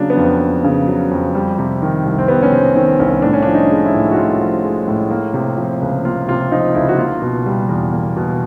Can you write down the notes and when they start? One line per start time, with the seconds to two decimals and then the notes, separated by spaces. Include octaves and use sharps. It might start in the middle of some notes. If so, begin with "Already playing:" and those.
Already playing: C#3 F#3 A#3 D4
0.10 B3
0.17 F2
0.41 A#3
0.64 C#3
0.88 F#3
1.11 F2
1.35 G3
1.58 C3
1.82 D#3
2.06 C2
2.18 C4
2.28 G3 B3
2.42 C#4
2.52 C3 C4
2.76 D#3 C4
2.99 C2 C#4
3.22 A2 D4
3.33 C#4
3.43 F3 D4
3.54 D#4
3.70 G#3
3.86 E4
3.94 A2
4.12 F#4
4.16 A2 F4
4.40 F3
4.63 G#3
4.88 A2
5.11 A#3
5.34 C3
5.58 F3
5.81 C#2
6.05 A#3 F4
6.28 C3 F4
6.51 F3 D#4
6.75 C#2 E4
6.89 F#4
6.98 A#3 F4
7.22 B2
7.46 G3
7.69 E2
7.93 A#3
8.16 B2